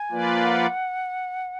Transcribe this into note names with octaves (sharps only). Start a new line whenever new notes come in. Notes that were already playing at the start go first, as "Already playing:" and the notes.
Already playing: G#5
F3 A#3 F4 B4 D5
F#5